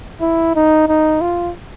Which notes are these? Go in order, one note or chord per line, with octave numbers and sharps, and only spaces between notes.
E4
D#4
D#4
F4